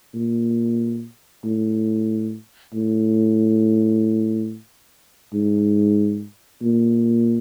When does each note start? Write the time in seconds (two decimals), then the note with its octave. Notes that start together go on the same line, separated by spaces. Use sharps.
0.14 A#2
1.44 A2
2.74 A2
5.33 G#2
6.63 A#2